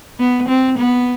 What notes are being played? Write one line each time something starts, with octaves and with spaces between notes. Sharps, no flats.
B3
C4
B3